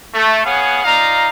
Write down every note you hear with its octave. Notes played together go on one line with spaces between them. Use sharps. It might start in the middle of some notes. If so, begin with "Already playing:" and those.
A3
B3 G#4 C#5 F5 F#5 G#5
D#4 F4 D5 F5 A#5